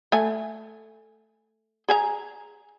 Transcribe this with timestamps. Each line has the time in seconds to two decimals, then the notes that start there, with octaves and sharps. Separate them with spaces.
0.12 A3 G#5
1.89 G#4 G#5 A#5